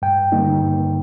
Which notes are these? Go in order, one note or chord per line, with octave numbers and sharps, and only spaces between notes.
G2 G5
D3 G3 A#3 D#4
G2